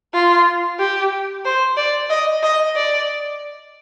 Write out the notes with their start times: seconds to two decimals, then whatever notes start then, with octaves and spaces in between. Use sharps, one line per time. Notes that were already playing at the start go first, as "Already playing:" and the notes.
0.14 F4
0.79 G4
1.45 C5
1.77 D5
2.10 D#5
2.43 D#5
2.76 D5